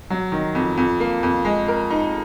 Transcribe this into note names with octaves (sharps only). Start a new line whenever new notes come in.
F#3
D#3
F2
F2
A#3
F2
G#3
A#4
D#4